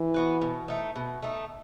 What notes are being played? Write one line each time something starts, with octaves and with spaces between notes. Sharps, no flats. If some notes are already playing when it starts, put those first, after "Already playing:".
Already playing: E3
B3 F#4 B4
B2
A3 D#4
B2
A3 D#4